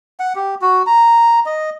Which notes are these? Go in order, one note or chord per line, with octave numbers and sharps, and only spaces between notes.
F#5
G4
F#4
A#5
D#5